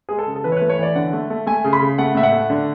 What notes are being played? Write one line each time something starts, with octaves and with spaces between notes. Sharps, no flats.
G#3 G#4
A4
C#3
A4
E3 B4
C#5
A3 B4
C#5
E3 D5
D3 F#5
A3
A3
A3 G#5
C#3
B5
C#3
A3 F#5
A2 E5
F#5
A3
D3